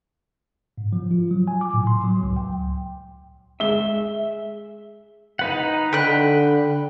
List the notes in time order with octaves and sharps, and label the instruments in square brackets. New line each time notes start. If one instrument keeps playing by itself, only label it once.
[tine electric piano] G#2
F3
F4
F#3
G#5
D6
A2
C6
F#3
C#2
G5
[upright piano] G#3 G7 [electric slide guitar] E5
[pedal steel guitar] D#4 B4 F#5
[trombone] D3 [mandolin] G5 F#6 [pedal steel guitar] B5